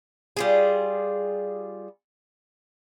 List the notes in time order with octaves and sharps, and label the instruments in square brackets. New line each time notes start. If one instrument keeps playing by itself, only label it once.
[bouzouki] G3 F4 G#4